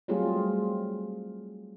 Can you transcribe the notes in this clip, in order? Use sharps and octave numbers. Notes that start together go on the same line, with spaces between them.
F#3 G3 A3 C4 F4 G#4